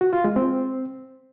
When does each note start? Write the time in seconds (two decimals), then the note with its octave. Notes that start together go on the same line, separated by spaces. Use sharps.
0.01 F#4
0.13 F4
0.24 G#3
0.36 C4